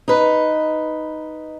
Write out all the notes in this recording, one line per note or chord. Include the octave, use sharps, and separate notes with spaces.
D#4 B4